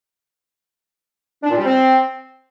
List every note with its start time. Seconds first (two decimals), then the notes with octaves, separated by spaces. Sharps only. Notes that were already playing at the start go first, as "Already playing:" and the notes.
1.43 D4
1.50 A#2
1.58 G3
1.65 C4